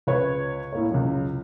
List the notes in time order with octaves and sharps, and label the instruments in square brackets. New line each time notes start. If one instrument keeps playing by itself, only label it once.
[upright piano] C#2 B4 C#5
A2 A#3 C#5
C#2 F#2